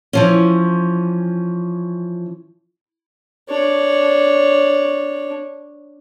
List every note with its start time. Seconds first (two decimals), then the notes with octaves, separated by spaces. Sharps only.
0.13 E3 F3 C#4
3.48 D4 C#5